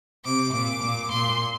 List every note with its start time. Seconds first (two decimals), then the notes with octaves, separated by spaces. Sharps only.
0.25 C3 D6
0.53 A#2 D6
0.82 A#2
1.11 A#2 C6